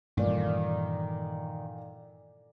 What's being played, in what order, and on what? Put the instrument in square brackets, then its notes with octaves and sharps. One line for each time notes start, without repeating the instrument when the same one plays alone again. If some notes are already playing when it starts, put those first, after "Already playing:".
[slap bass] G2 E3 [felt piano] A#2 [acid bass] D#3 [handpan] A3 D5